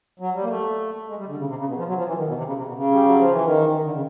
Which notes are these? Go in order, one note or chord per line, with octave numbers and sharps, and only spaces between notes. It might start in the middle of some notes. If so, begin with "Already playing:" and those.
F#3
G3
A#3
A3
G#3
G3
D3
C#3
C3
C#3
B2
F3
F#3
F3
E3
D#3
B2
C3
C#3
C3
B2
C#3
G3
F#3
F3
E3
D#3
D#3
D3
C#3